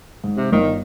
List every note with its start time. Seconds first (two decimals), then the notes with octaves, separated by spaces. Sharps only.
0.24 G#2
0.37 C3
0.52 G1 D#3